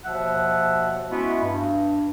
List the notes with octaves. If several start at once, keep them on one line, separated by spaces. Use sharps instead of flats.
D#2 B2 F3 E5 F#5
G#3 A3 B3 C#4 E4 F#4
G2